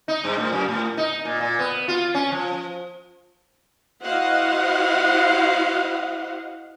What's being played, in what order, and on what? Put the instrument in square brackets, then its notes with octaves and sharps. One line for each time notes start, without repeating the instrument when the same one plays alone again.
[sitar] D#4
G2
A2
F#2
A2
D#4
A#2
A#2
B3
F4
C#4
F3
[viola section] E4 F#4 C5 D#5 F5 F#5